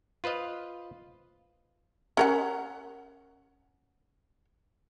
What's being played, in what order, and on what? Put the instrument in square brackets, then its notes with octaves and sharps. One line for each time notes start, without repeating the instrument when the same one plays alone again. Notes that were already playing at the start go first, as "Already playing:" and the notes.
[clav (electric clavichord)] F4 B4 C5 D#5 F5
[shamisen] C#4 A#4 F#5